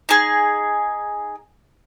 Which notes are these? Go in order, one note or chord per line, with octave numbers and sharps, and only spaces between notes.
D#4 G#4